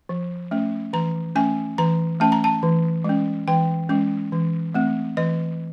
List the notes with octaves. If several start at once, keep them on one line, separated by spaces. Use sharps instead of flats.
F3
A3 C#4
E3 A#5
A3 C#4 G#5
E3 A#5
A3 C#4 A5
A#5
A5
E3
G#3 C#4
E3 G5
G#3 C#4
E3
A3 C4
E3 D#5